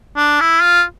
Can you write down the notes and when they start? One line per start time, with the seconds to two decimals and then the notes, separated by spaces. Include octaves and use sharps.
0.17 D4
0.40 E4
0.62 F4